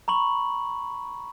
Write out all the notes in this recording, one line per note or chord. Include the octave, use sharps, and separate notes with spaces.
A#5 B5 C#6 F#7